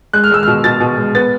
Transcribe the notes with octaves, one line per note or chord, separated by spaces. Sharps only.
G#3 F#6
F6
G#3 E6
F6
B2
B2 A6
B2
G#3
B3 A6